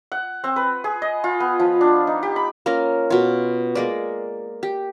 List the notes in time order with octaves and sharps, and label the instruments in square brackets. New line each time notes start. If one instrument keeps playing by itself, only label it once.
[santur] F#5
C4
B4
G#4
D#5
F4
B3
F3
D4
D#4
G4
B5
[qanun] A#3 C#4 F4 A#4
B2 F4
G#3 A#3 D5
G4